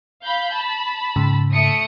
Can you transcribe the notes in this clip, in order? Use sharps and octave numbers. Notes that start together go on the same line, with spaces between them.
F5 B5 G6
A5 B5
G#2 C#3
A3 D#6 C#7